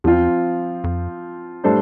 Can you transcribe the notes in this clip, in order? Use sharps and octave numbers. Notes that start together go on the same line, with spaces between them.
E2 F3 C4 F4
F2
A2 G3 D4 A4 C5